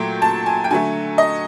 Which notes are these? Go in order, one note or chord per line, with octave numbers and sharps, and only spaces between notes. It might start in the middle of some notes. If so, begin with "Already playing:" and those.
Already playing: A#2 F#3 A3 G5
A5
G#5
G5
D3 F#3 A3 G#5
D#5